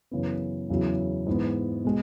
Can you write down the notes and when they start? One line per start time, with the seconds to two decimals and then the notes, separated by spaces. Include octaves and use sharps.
0.11 F#2 C#3 E3 B3
0.69 E2 C#3 F#3 B3 E4
1.27 G#2 E3 B3
1.84 B2 G#3